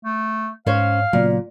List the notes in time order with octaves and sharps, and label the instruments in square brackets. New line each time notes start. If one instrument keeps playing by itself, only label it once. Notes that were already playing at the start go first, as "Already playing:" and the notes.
[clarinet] A3
[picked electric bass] G#2 [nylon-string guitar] C#4 C5 C#5 [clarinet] F5
[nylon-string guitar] A#2 [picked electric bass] C#3 F#3 B3